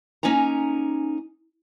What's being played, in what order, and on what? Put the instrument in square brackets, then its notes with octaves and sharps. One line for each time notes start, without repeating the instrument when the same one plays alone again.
[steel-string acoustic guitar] A#3 C#4 D#4 G#5 A#5